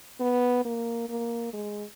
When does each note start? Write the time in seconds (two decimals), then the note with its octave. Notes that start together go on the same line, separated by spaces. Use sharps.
0.20 B3
0.65 A#3
1.09 A#3
1.53 G#3